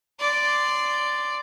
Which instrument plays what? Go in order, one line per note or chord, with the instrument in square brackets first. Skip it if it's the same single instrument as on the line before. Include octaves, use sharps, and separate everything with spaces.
[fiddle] D5 C6